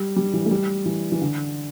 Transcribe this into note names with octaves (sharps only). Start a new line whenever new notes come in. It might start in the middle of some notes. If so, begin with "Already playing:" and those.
Already playing: G3
G3
E3
A3
G3
E3
E3
D3